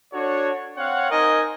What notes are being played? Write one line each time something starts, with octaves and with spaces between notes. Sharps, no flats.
D4 F#4 A4 C#5
C4 C#5 F5 F#5
D#4 A#4 C5 D#5 G#5